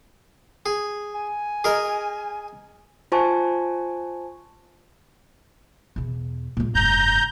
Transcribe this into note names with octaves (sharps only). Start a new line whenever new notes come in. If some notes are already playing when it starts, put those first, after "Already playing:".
G#4
G#5
G#4 A#4 D#5
F4 C5 G#5 A5 C#6
E2 B2
A#2 G#3
F1 G2 A#5 G6